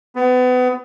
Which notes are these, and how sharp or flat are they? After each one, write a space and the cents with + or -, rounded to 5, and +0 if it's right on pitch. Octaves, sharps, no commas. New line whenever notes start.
B3 +30